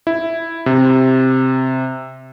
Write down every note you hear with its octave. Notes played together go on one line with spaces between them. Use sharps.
E4
C3